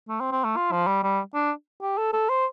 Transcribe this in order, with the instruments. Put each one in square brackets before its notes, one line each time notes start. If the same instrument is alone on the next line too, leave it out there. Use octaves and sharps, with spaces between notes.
[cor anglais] A3
C4
C4
A3
F4
F3
G3
G3
D4
G4
A4
A4
C5